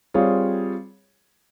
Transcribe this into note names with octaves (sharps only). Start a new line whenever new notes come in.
G3 C4 F4 G#4 C#5